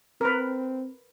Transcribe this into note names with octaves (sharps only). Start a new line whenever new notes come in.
C4 A#4 B4